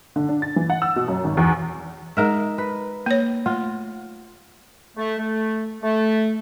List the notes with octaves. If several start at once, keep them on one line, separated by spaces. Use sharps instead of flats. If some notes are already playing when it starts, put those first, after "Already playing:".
D3
D4
A6
E3
F#5
E6
B2
F#2
G#1
E2
G#3 D#4 G#4 A#4 E5
B4
A#3 C#5
A3 F4
A3
A3
A3